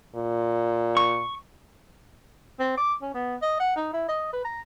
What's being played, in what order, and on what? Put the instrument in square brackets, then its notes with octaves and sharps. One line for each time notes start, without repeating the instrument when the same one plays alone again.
[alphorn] A#2
[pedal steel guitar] C#6
[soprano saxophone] C4
D6
C#4
B3
D#5
F#5
D#4
E4
D#5
B4
A#5